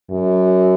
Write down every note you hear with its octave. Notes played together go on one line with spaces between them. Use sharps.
F#2